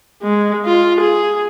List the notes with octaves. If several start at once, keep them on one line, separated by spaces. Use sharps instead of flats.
G#3
F4
G#4